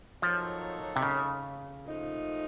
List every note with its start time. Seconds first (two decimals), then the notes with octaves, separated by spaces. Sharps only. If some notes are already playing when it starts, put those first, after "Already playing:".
0.21 F3 F#3 A#3 D#4 A4 C#5
0.96 C3
1.03 C#3
1.84 A#2 F3 A3 D#4